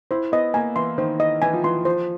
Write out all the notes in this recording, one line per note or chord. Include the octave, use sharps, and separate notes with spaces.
E4 C5
B3 D#5
A#3 G#5
E3 C6
D#3 C5
D#5
E3 G#5
F3
E3 C6
F3 C5